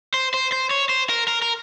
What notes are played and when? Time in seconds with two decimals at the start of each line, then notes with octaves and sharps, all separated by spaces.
0.14 C5
0.34 C5
0.52 C5
0.71 C#5
0.89 C5
1.09 A#4
1.28 A#4
1.42 A#4